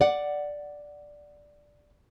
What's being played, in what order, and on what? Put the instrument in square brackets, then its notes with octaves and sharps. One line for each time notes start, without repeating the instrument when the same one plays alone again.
[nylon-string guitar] D5 F#5